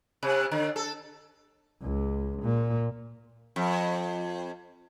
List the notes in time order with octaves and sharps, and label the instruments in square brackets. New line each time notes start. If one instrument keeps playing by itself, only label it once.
[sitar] C3
D3
A4
[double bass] C#2
A#2
[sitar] F2